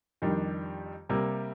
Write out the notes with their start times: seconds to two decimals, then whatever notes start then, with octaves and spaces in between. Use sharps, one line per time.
0.22 F2 D#3 G3 D4
1.09 C3 G3 A#3